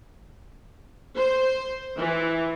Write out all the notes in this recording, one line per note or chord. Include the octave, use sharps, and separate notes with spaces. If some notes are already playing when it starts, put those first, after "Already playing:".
C5
E3